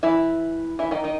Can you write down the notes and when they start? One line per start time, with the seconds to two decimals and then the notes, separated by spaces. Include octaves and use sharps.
0.03 E3 E4
0.79 E3 E4
0.91 D#3 D#4
1.04 D#3 D#4